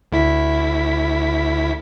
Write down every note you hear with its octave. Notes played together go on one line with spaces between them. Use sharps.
D2 E4 B6